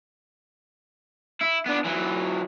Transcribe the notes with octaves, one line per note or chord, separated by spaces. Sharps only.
E4
B3 D4
E3 F#3